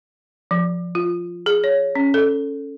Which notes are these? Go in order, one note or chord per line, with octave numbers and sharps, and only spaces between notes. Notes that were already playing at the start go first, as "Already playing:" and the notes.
F3
F4
G#4
C#5
C#4
A4